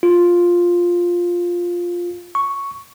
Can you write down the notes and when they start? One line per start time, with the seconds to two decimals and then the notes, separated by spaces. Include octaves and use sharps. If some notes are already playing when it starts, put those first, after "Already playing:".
0.03 F4
2.35 C#6